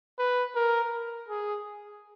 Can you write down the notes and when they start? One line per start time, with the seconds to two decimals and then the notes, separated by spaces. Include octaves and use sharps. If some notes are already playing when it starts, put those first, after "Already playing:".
0.19 B4
0.55 A#4
1.29 G#4